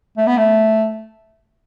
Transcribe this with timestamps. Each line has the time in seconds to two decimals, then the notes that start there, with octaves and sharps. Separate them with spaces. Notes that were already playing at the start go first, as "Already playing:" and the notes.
0.17 A3
0.27 B3
0.37 A3